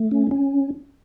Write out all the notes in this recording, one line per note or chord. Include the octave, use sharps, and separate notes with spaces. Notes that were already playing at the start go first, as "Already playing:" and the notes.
Already playing: A3
C#4
C#4